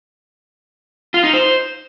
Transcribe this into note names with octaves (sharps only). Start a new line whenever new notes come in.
F4
D#4
C5